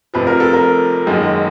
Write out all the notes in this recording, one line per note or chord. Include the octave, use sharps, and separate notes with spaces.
F1 F2 C3 F3 B4
A#4
A4
A#4
F#1 F#2 D#3 G#3